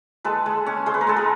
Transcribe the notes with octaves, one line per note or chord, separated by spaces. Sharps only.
G#3 A4 B4
G#3
C#4
G#3 C5
B4
A#4
G#3 A4 B4
G#4 A#4